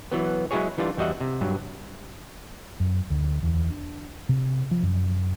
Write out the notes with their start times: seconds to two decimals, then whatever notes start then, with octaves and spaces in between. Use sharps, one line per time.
0.12 E3 F#3 B3
0.51 F#3 G#3 E4 F#4 G#4 C#5
0.78 E3 G3 D4 F4
0.97 E2 G3 F#4 D#5 E5 F#5
1.20 C3
1.41 G2 F#3
2.80 F#2
3.10 D2
3.43 E2
3.70 D4
4.29 C3
4.71 F3
4.83 F#2